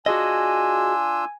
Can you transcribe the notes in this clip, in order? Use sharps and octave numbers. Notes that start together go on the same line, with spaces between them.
D4 F4 F#4 G#4 D#5 G#5 E6